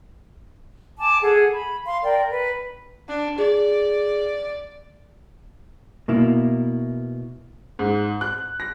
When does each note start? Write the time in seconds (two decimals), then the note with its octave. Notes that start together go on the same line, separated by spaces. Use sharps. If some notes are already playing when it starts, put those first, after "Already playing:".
0.99 G#5 A5 D6
1.22 G#4 A4 F#5
1.53 B5
1.86 F5 C6
2.03 A#4 D5 G5
2.31 B4
3.08 D4
3.38 G#4 D5
6.08 B2 A#3 E4
7.79 G#2
8.21 F#6
8.60 A#6